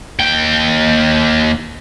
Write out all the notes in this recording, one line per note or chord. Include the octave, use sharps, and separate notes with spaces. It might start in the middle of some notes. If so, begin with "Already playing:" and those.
D#2 G5